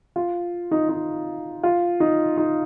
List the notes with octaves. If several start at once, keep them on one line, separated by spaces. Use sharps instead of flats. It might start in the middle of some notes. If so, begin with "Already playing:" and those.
F4
D#4
D#4
F4
D#4
D#4